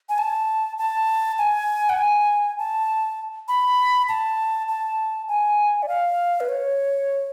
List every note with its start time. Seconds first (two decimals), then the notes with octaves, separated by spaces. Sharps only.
0.09 G#5
0.18 A5
0.78 A5
1.38 G#5
1.89 F#5
1.98 G#5
2.58 A5
3.48 B5
4.09 A5
4.68 A5
5.28 G#5
5.82 D5
5.88 F5
6.40 B4
6.49 C#5